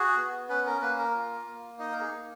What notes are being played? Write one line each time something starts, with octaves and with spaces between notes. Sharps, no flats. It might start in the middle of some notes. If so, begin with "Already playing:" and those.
Already playing: F#4 G#4
B3
C#4 B4
A#4
A#3 B4
A#4
F4
A#3
D#4 D#5
A#4
G#4
A#3